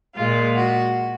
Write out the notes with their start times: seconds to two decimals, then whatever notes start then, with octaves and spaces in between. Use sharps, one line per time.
0.15 A#2 G#3 F4
0.56 F#4